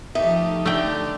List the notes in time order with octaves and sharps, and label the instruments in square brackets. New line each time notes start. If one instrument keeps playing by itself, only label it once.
[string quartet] F3 A3 G4 [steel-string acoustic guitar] D#4 [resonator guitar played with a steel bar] E5
[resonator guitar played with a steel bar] D3 [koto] A3 G5 [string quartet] G4